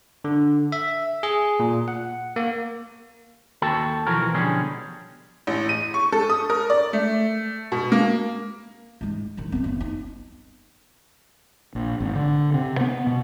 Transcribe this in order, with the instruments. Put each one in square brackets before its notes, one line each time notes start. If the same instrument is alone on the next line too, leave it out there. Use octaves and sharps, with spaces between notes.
[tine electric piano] D3
E5
G#4
A#2
F#5
A#3
[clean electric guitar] D#2 F#4 A4 G5 A5
B1 E3 F3 F#4 A#4
B2 D3 F3 G3 C#4 G#4
[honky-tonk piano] A1
D#7
C#6
A4
D#6
A#4
D5
A3
B2
A#3
[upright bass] G#2 G#3
A1 D#3
B3 C4
F#1
D#4
[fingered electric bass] A#1
G#1
D3
C3
B3
B2